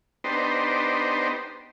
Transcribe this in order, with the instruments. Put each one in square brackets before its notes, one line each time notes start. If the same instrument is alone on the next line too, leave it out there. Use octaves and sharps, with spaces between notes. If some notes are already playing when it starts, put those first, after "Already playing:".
[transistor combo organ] B3 D4 D#4 G4 C5